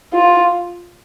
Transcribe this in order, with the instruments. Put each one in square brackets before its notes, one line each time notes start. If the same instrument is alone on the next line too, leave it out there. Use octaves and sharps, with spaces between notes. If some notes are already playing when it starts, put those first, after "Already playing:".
[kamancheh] F4